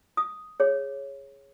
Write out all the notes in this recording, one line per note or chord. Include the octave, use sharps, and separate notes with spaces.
D#6
G#4 C#5